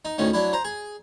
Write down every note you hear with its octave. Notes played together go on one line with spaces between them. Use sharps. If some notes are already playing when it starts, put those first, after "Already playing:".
D#4
D2 A2 D#3 C#4
F#3 D4 E4
C5 A#5
G#4